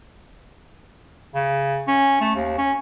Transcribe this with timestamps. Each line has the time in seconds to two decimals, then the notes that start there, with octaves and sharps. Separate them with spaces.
1.34 C#3
1.87 C#4
2.21 A3
2.35 D#2
2.57 C#4